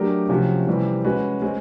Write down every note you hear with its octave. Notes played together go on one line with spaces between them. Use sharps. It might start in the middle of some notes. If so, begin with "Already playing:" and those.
Already playing: F#3 A3 D4 G4 A#4
C3 F3 A3 C#4 F#4
C3 E3 G3 C4
G#3 C#4 F#4 B4
G#3 C4